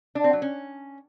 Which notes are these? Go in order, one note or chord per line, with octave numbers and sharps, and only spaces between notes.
D4
C4
F#3
C#4